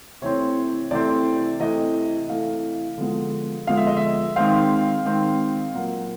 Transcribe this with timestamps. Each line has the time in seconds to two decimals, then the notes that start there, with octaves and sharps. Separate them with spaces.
0.22 C3 E3 A3 C4 C#5
0.91 C3 E3 A3 C4 D5
1.60 C3 E3 A3 D#5
2.29 C3 E3 A3 F5
2.98 D3 F3 G#3 B3
3.67 D3 F3 G#3 B3 F5
3.77 E5
3.87 D#5
3.97 E5
4.36 D#3 G#3 C4 F5
5.06 D#3 G#3 C4
5.74 A#2 F#3 A#3 F#5